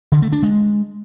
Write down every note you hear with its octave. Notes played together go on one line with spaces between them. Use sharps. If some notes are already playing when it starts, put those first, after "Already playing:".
D3
A3
D4
G#3